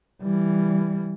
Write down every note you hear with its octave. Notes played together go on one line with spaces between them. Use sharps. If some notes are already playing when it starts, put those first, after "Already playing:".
E3 G3